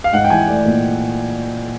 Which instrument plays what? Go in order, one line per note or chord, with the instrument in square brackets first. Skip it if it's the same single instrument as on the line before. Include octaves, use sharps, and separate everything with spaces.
[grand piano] F5
[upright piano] G#2 [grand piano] F#5
[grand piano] G5
[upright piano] E3 [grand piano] G#5
[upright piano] A3 [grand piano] D5
[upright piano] A#2